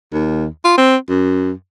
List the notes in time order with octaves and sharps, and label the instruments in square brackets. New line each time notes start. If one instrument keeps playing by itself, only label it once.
[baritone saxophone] D#2
F4
C4
F#2